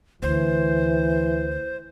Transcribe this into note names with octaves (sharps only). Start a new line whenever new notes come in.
D2 E3 C5